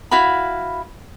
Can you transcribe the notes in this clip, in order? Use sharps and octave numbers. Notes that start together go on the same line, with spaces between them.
E4 F#4 F5 B5